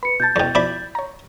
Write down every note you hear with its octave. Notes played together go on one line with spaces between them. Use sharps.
B4 B5 C#7
B2 A5 G6 A6
E2 B2 C#5 G5
B2 F3 E4 D5 B5 D#7
C#5 A#5